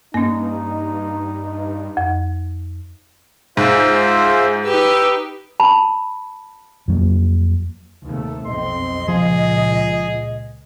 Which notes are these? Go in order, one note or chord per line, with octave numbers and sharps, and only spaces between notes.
G2 A#3 C#4 D#4
F2
G#2 F4 G#4 C5 E5
D#4 G4 B4 E6
A5 B5
F2 F#3 A#3
D#2 C3 A3
B1 F2 C4 D#5 C6
C#2 A#2 F3 G#4